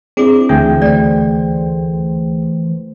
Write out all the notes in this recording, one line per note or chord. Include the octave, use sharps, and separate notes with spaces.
C4 D4 E4 G#4 D6
D2 E3 G#4 E5 G5
A3 C5 D5